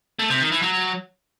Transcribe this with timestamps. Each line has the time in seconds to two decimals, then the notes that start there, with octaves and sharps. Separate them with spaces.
0.19 A3
0.30 C3
0.41 D#3
0.51 E3
0.62 F#3